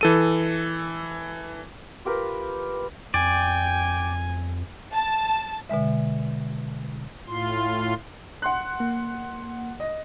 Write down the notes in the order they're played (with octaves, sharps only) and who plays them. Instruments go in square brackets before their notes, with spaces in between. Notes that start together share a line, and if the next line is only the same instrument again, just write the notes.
[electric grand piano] E3 A4 D#7
[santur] F4 G4 A#4 B4
[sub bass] F2 [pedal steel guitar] D5 [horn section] G5 [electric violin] G#5
[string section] A5
[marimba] B2 D3 G#3 E5
[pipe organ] A2 F4 C6
[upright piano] F#5 C6 F#6
[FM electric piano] A#3
[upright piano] D#5